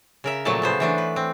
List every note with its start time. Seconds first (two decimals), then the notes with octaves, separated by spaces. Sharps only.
0.24 C#3 A#4 E5
0.45 A#2 F3 F#3 A3 A#3 A5
0.62 C#3 B3 C5
0.80 E3 A3 D4
0.98 B4
1.16 C4